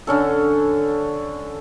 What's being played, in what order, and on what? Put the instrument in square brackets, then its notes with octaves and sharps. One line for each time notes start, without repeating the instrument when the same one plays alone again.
[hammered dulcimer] D3 C#4 A4